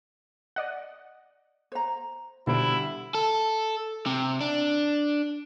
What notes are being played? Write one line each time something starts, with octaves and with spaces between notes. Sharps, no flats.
D5 D#5 F#5
C5 A#5
B2 D3 G3 E4 C5 D7
A4
C3
D4